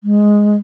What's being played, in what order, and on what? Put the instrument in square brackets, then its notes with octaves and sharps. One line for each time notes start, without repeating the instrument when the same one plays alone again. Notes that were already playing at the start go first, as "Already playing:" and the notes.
[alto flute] G#3